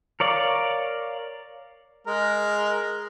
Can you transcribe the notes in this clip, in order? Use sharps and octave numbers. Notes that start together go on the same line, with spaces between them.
A#4 C#5 D5 F5
G#3 A#4